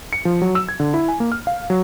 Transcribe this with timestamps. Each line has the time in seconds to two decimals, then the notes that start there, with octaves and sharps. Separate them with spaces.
0.13 C#7
0.25 F3
0.42 F#3
0.55 E6
0.69 G#6
0.80 D3
0.94 E4
1.08 G#5
1.20 A#3
1.32 F6
1.47 F5
1.70 F#3